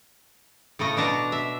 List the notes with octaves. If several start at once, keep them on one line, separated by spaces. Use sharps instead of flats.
A2 C#3 A3 D#5
B2 D4 A5 A#5
E5